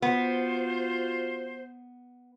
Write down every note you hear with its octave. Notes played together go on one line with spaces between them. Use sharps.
B3 F4 F#4 C5